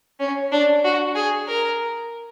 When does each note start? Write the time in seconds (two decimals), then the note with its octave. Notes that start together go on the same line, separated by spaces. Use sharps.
0.20 C#4
0.52 D4
0.84 F#4
1.16 G#4
1.48 A#4